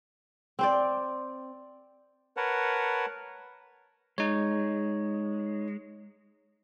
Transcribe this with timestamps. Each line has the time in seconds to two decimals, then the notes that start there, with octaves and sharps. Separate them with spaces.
0.59 C4 C5 D5
2.37 A#4 B4 C#5 F#5 A5
4.18 G#3 D#4 C#5